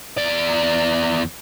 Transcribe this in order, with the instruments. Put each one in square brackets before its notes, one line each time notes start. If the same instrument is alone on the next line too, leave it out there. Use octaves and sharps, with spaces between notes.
[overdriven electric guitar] E2 D5